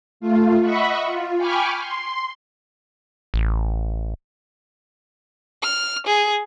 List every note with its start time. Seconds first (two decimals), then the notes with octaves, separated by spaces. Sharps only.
0.20 A3 F4
0.61 D#5 E5 F#5 B5 C#6
1.06 F4
1.37 G5 G#5 B5 C#6 D6 F6
1.78 C6
3.34 A1
5.62 F6
6.06 G#4